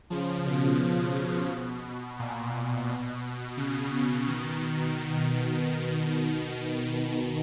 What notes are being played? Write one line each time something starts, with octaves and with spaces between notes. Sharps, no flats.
C#3 F3
B2
B2
A#2
B2
C#3
B2 D#3